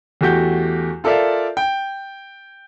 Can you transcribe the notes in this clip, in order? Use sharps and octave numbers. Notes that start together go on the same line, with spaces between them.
E2 A3 F#4 G4 G6
F4 A4 A#4 D5 E5 F5
G5